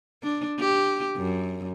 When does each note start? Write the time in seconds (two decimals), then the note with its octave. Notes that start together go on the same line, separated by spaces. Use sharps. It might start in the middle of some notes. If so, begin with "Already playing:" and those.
0.23 D4
0.59 G4
1.17 F#2